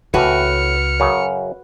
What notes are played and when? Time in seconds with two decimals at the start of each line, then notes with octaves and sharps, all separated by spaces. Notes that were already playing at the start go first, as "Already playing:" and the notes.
0.14 C#2 A2 E3 F#4 B4 F6 C#7
1.00 F#2 C#3